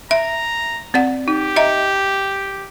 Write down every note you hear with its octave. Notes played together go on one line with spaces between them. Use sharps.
E5 A#5
C4 D5 F#5
D#4 G4
D#5 E5 A#5